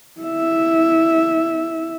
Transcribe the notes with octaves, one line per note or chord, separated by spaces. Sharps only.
E4 E5